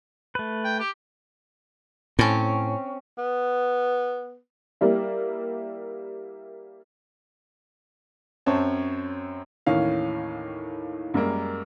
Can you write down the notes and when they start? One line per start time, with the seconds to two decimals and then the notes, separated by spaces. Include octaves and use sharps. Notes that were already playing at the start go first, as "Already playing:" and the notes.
0.35 A3 B4
0.65 G5
0.79 G4
2.19 A2 C4 C#4
3.18 B3
4.81 G3 A#3 E4
8.46 F#2 C4 C#5 A5
9.66 D#2 A2 D#3 E3 C#4 F5
11.14 F#2 G3 G#3 A#3